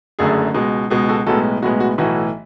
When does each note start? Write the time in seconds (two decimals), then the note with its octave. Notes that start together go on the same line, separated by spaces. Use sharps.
0.19 F#1 F#2 D3 A3 G#4
0.54 C#2 B2 G#3
0.90 C#2 B2 G#3 G#4
1.09 F#4 A4
1.26 B1 A2 G#3 B3 F#4 A4
1.62 B1 A2 G#3 B3 F#4
1.80 F#4
1.98 B1 A2 E3 A3 F#4